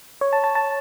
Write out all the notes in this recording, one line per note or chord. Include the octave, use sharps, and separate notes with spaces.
C#5
A5
A5
A5